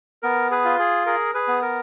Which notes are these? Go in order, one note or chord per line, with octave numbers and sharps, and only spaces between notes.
B3 A#4
G#4 B4
F4
G#4
G#4 A#4
G#4 B4
B3
A#4